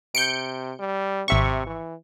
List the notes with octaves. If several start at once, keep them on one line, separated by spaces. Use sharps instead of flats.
C3 G6 C#7 D7
G3
G#1 C3 E5 C#6
E3